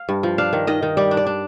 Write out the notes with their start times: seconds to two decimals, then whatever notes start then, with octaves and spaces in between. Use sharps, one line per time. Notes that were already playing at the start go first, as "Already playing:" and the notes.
Already playing: F5
0.09 G2
0.23 F3
0.38 D4 F5
0.53 D#3
0.67 D#3 D#5
0.82 D#3
0.97 G3 D5
1.11 D4
1.17 D5
1.26 D4